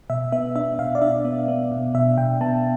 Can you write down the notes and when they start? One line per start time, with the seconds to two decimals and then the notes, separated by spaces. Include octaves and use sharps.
0.10 B2 E5
0.32 B3 E5
0.56 D4 E5
0.79 B2 F5
0.95 D5
1.02 D4 E5
1.25 B3
1.48 B3
1.72 B2
1.95 B2 E5
2.18 B2 G5
2.41 B3 A5